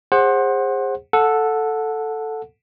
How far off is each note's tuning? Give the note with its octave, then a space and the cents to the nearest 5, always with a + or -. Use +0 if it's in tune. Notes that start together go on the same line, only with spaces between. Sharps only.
G#4 -30 C5 +25 F#5 +0
A4 +0 F#5 -20